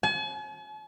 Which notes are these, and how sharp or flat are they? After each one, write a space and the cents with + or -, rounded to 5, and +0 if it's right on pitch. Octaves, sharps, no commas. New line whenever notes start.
G#5 +45